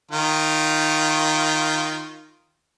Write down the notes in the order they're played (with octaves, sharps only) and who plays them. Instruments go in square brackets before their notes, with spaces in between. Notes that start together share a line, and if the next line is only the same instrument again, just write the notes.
[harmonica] D#3 F4